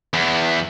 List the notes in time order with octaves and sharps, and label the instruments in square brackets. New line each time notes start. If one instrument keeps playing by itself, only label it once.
[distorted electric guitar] E2